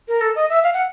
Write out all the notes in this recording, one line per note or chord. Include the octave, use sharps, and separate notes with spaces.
A#4
A4
D#5
E5
F5
F#5